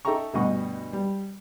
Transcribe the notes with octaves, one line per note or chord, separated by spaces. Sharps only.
D#4 A4 E5 G5 A#5 C#6
D2 G2 B2 D#5 F#5 C#6
G3